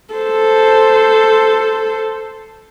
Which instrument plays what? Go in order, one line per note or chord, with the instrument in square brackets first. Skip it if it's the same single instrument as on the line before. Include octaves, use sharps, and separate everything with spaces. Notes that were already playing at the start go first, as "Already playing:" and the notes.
[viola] A4 C5